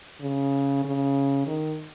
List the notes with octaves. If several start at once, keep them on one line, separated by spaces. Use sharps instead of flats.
C#3
C#3
D#3